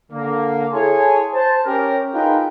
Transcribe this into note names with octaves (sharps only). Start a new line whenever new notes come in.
D3 A#3
E4 G#4 A4 C#5 G#5 C6
C5 A5
C#4 G4 A#4
D#4 F4 G#4 A#4 B4 G5